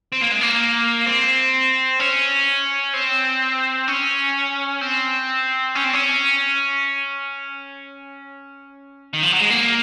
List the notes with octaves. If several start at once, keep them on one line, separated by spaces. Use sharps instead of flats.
C4
A#3
G#3
A#3
C4
C#4
C4
C#4
C4
C#4
C4
C#4
D#3
F3
F#3
G#3
A#3